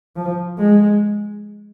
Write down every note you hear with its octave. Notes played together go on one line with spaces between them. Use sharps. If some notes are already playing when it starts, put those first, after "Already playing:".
F3
G#3